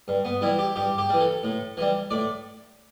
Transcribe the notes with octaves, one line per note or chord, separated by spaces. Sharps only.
G2
B3
E3 G3 E4
G4
G2 G4
G4
E3 G3
A4
A2
E3 G3
A2 D5